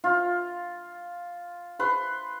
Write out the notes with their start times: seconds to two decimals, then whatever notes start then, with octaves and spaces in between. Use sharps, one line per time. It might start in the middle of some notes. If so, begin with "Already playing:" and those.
0.04 F4
1.79 B4 C6